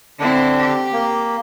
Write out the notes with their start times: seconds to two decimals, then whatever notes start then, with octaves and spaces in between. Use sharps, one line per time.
0.20 D3 C4 D4 E4
0.59 G4
0.93 A#3